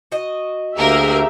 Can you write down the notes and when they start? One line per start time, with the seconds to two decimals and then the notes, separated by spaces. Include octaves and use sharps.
0.12 F#4 D#5
0.77 D2 A#3 G4 G#4 A#4 E5